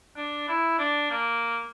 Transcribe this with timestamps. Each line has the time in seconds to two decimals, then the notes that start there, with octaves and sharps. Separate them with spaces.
0.17 D4
0.48 E4
0.79 D4
1.11 A#3